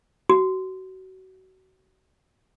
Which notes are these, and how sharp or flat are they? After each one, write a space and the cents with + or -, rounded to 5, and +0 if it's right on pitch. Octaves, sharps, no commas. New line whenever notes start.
F#4 +25